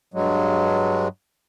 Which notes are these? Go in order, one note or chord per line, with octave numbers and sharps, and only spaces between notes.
G2 F#3 G#3